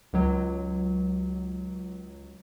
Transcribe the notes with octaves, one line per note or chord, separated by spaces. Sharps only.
C#2 F#3